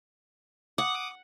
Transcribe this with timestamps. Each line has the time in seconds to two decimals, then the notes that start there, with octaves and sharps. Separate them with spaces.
0.78 F#5 D6 D#6